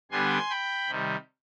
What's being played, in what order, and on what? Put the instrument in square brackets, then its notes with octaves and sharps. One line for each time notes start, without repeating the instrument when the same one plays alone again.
[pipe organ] D3 G3 B3 D4 G#5 C6
G5 B5
C3 D#3 G3